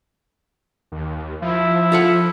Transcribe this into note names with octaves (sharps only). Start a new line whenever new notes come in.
D#2
F3 E4
F4 A4 F#5